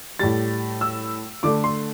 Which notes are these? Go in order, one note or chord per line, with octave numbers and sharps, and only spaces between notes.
A2 G3 A6
E6
D3 A3 D6
C6